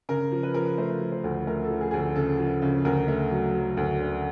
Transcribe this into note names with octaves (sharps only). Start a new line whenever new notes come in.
C#3 A#4
F3
B4
F3 A#4
B4
A3 C5
F3
C5
D2
A3 A#4
A4
F3
G#4
D2 G#4
A4
C#3 A4
F3
C#3
D2 A#4
A3
F#3
F#3
D2
D3